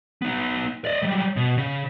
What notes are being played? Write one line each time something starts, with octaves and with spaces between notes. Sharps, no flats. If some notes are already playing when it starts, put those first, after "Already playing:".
B3 D#4
D5 D#5
F#3 G3
B2
C#3